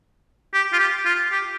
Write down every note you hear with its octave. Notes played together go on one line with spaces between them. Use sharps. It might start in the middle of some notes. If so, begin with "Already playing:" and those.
G4
F4
G4
F4
G4